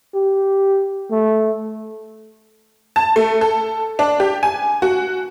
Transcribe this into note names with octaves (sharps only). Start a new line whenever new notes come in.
G4
A3
A5
A3
A4
D4
G4
G#5
F#4